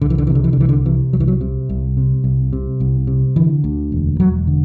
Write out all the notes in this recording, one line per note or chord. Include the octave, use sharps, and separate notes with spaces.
C2 D3
E3
D3
C3 E3
D3
E3
D3
C2 E3
D3
C3 E3
C2 F#3
E3
F#3
C3
C2
C3
C2
C3
C2
C3
D3 E3
D2
E1
E1 F#3
D3